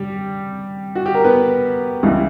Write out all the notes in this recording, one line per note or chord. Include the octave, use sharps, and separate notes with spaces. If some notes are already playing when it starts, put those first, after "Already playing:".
Already playing: G3 G4
F#4
G4
A#4
B3 B4
C#2 C#3 E3 G3